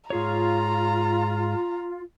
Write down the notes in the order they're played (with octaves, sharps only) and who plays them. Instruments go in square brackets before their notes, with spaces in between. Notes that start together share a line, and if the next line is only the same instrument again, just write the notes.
[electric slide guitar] G#2 G#4 C#5 [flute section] F4 [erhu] A#5